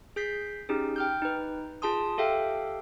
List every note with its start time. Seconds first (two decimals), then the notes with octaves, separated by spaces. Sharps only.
0.16 G#4 G6 B6 C7
0.69 C#4 D#4 G4 G#4
0.96 G5 F6 G6
1.22 D#4 B4
1.82 F4 G#4 A5 C6 D#6
2.18 G4 A4 E5 F5 G5